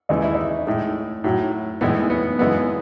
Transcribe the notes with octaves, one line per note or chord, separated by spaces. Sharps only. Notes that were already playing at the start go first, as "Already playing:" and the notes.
D#2 C#3 E3 G#3 D#4
E4
D#4
A2 G#3
A2 F#3
A2 E3 G#3 B3
B3
F#2 C#3 E3 G#3 B3